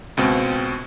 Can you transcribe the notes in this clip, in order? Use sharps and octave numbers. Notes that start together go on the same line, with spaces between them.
C#2 B2 C4